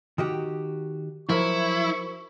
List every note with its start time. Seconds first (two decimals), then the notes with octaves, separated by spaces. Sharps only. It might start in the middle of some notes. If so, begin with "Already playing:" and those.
0.18 D#3 F#4 G4
1.29 F3 F#3 E4 F#4 A#4 C5 C#6